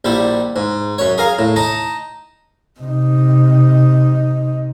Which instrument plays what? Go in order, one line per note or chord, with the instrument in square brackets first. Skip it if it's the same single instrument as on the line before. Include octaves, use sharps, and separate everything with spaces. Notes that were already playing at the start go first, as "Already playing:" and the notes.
[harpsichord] A#1 G3 E4
G#2
F#2 C#5
G#4 A#4 F5
A2
D#4 A5 A#5
[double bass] C3 D#4